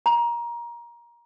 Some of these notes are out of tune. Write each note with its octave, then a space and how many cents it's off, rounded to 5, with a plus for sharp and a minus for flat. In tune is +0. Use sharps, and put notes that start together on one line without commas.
A#5 +20